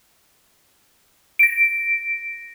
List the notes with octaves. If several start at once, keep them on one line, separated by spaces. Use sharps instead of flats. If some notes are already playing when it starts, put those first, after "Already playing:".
A#6 D7